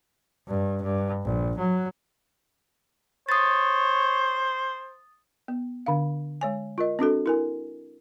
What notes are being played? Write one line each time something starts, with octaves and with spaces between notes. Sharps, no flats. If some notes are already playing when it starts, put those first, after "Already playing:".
G2
G2
A#1
F#3
C5 C#5 D#6 A6
B3
D3 D4 F5
G#3 C#5 G#5
F4 A#4 D#5
C4 D4 F#4 A4
E4 A#4 G#5